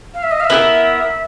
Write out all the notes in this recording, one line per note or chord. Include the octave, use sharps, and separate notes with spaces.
F5
E5
D#5
F5
E5
B3 E4 G4 A#4